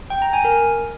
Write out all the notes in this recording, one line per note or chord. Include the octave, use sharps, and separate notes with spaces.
G5
A#5
G#5
A#4